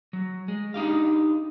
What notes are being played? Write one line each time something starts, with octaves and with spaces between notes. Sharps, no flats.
F#3
G#3
D4 D#4 G4 F5